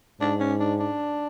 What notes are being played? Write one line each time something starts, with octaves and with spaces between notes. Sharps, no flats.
G#2 D4
C#4
D4
D4